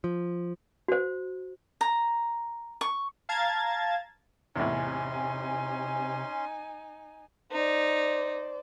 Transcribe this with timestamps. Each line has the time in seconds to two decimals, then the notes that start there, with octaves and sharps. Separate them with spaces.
0.04 F3
0.88 F#4 C5
1.81 A#5
2.81 C#6
3.29 F5 A5 A#5 G#6 A6
4.56 E2 A2 C3 C#4 D#4 G#5 C6
7.52 D#4 C5 D5